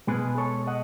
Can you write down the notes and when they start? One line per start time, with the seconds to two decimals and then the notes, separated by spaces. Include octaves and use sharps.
0.07 B2 G#3 G#4 B4
0.38 A4 C#5
0.67 D#5 F#5